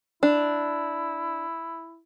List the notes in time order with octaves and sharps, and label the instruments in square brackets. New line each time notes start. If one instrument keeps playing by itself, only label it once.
[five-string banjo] D4 [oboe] E4